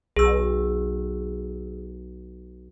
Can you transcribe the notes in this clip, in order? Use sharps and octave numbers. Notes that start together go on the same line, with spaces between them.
B1 G#4 E6